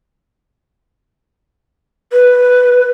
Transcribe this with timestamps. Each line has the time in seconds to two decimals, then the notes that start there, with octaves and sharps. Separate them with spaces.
2.13 B4